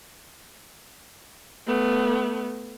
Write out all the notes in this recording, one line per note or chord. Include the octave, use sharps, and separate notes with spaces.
A3 B3